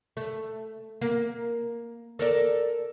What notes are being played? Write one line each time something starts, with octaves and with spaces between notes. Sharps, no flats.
A3
A#3
A4 A#4 D5